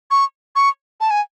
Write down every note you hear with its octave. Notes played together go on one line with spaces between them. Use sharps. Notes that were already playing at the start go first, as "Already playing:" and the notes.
C#6
C#6
A5
G#5